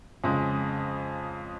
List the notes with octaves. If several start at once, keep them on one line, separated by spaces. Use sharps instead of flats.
F2 C#3 G#3